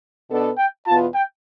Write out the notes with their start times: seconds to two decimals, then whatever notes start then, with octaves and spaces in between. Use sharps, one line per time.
0.30 B2 B3 D4 A4
0.58 G5
0.86 E2 B2 B3 F4 A5
1.14 G5